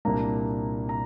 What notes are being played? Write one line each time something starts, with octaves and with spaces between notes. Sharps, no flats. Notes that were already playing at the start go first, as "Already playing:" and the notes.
C2 A#2 A#3 D4 A#5
A#5